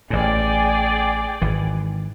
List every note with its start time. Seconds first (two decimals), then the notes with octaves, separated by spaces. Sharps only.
0.10 A1 A2 G#4 D5 G5
1.41 G#1 E3